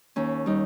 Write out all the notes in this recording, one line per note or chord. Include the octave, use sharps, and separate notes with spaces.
D#2 C#4
G3 D#4